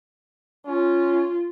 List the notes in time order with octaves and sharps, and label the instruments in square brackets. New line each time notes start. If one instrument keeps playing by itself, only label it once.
[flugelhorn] C#4 [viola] F4